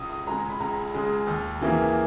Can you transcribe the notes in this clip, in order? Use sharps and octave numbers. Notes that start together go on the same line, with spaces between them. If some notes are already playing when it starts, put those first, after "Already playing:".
Already playing: C#2 D#6
D#6
C#3 G#3 A#5
B5
C#2 A#5
C#3 G#3
D#2
C#3 E3 A#3